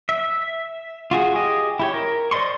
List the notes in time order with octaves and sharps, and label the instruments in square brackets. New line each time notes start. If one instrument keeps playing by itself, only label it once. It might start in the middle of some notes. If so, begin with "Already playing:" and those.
[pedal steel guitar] E5
F4 F#4 G#4
G4 G#4 D#5
E4 G4 C#5
A#4
C5 D5 D#5 C6 C#6